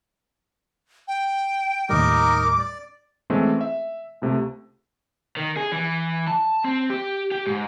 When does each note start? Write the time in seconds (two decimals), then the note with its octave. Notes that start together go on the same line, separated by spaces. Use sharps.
1.08 G5
1.89 D#2 A2 G3 D#4 A#4 D6
2.59 D5
3.30 E3 G#3 A3 C4 C#4
3.61 E5
4.22 C#2 C3 A3
5.37 D#3
5.57 G#4
5.72 E3
6.27 A5
6.64 C4
6.90 G4
7.32 G4
7.47 G#2